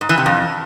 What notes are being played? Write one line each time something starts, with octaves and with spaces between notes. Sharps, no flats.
G#2
E3
C3
F2